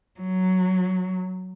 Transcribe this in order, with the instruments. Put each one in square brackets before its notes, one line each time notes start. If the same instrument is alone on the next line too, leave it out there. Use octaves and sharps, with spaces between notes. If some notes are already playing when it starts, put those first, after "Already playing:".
[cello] F#3